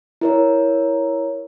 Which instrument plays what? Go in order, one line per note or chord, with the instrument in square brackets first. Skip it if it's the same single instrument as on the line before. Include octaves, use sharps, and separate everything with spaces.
[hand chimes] E4 A#4 C#5